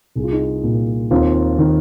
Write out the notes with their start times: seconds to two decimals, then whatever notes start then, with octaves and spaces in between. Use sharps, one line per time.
0.15 C2 G#4
0.24 F4
0.31 D#4 G#4
0.64 A#2
1.11 D#2 C4 F4
1.58 D#3